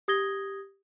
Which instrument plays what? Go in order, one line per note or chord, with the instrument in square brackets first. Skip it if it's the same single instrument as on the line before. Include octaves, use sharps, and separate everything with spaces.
[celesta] G4 D#6 G#6 A#6 G7